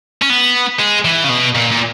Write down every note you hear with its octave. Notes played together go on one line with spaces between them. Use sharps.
C#4
B3
G#3
E3
C#3
B2
A#2
A#2